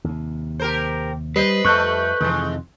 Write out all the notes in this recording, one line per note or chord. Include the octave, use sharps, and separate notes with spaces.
D#2 C3
G4 A#4 C5
G3 B4 C5 D#5 C7
F2 G3 A3 C#6 F#6 G6
F2 C3 D#3 E3 G#3